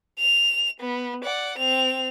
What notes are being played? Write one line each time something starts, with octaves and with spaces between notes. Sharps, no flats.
F7
B3
D5 F#5
C4 F7